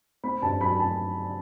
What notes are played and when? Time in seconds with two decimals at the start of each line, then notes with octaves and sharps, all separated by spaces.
0.24 C4 B5
0.42 G2 A5
0.61 F#3 B5
0.80 A5